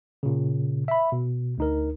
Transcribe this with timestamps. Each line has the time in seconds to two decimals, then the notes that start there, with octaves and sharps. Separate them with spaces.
0.23 A#2 C#3
0.88 E5 B5
1.12 B2
1.58 D2 D#4 A#4